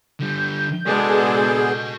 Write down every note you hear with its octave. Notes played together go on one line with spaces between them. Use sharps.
D3 G3 G6
G#3 B3 D4 F#4 G#4 A4 D#5